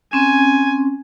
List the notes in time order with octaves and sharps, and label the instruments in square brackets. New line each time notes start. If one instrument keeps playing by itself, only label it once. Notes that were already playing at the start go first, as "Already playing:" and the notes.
[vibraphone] C4 C#4 [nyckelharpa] G#5